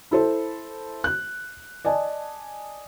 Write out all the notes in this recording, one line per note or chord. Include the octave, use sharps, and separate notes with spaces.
E4 A4 C5
F#6
D5 D#5 G#5 A5